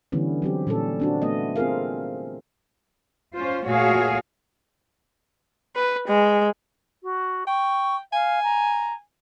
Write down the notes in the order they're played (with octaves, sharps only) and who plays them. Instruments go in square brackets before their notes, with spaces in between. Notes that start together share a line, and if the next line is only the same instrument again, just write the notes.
[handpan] D3 E3 G3 B3 C#4
F#3 C4 G4
A#2 G3 C#4 A4
C4 D4 F#4
A3 B3 D#5
C4 F4 G#4 A#4 F5
[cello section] C#4 F4 C5
A#2 A3 F#4 G#4 C#5 F5
[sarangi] B4
G#3
[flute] F#4
[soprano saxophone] G5 [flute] C#6
[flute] F5 [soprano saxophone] G#5
[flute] A#5